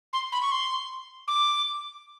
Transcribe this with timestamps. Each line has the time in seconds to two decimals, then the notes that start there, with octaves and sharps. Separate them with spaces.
0.13 C6
0.32 B5
0.42 C#6
0.52 C6
1.28 D6